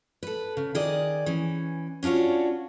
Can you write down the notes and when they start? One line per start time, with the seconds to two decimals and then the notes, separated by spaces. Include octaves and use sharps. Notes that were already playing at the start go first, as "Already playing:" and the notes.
0.23 A4 B4
0.57 C#3
0.75 D#3 G#4 D5 D#5
1.26 E3 C#4
2.03 C#4 D4 F4 F#4 C#5